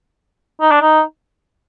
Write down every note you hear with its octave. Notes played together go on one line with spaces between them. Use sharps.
D#4
D4
D#4